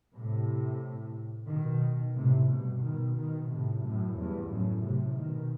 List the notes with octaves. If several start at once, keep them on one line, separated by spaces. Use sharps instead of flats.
A2 C3
B2 D#3
A2 C3
G2 B2
B2 D#3
B2 D#3
A2 C3
F#2 A2
E2 G2
F#2 A2
A2 C3
B2 D#3